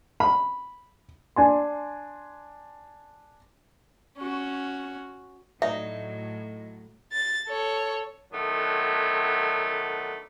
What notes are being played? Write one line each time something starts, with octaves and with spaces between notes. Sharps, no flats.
B5
D4 G#5 C6
C#4 F#4
A2 F#3 D#4 D5 E5
A6
A4 C#5
D3 D#3 F#3 A3 B3 D4